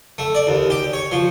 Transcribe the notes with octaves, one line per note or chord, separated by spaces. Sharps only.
A3
D5
D#2
G4
C#5
F3